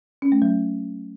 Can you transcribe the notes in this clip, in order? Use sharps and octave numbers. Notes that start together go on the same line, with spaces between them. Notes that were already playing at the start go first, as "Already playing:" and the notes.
C#4
A3
F#3